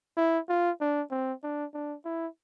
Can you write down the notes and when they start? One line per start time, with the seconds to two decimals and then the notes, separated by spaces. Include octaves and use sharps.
0.17 E4
0.49 F4
0.81 D4
1.11 C4
1.43 D4
1.74 D4
2.05 E4